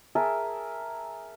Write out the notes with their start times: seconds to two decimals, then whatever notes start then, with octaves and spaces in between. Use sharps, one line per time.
0.15 G#4 A#4 E5 A5